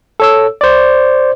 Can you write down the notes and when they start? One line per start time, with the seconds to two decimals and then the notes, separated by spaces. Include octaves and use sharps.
0.20 A4 C#5 E6
0.61 C5 D5